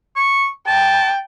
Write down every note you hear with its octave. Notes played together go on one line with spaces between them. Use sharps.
C#6
G5 A5